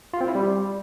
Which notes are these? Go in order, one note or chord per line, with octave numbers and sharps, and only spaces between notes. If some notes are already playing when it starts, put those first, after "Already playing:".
F4
C4
E4
G3